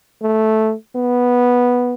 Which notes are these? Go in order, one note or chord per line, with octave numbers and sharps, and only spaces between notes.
A3
B3